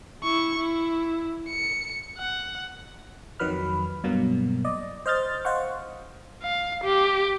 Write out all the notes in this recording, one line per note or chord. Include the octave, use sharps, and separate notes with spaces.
E4 C#6
E4
C#7
F#5
F2 D#3 F#3 B4 B5 F6
G2 B2 F#3 A#3
D5 D#5
C5 D#5 F6 G6 A6
C5 D#5 F5 F#5 C#6
F5
G4